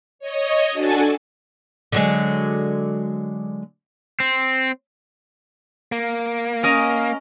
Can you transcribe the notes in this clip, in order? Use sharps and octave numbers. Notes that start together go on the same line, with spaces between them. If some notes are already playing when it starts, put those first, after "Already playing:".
C#5 D#5
D4 F#4 A4 G#5 A5
D3 F#3 G#3
C4
A#3
C#4 A#4 D#5